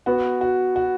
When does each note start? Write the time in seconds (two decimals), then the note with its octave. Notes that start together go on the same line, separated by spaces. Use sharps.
0.06 B3 F#4
0.41 F#4
0.76 F#4